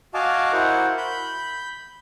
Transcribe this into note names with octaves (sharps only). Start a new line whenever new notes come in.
F#4 D#5 F5 G#5 A5 D6
E4 F#4 A#4 C5 F#5
B5 G6